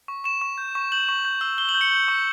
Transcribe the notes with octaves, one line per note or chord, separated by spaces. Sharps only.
C#6
C#6 E7
C#6
G6
C#6
G6 F#7
C#6
G6
E6
E6 G7
F#7
G6
C#7
G6
C#6